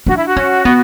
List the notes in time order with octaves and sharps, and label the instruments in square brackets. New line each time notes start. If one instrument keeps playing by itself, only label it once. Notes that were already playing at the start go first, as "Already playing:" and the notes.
[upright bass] D4 [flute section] F#4
[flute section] E4
F#4
[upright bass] C#4
B3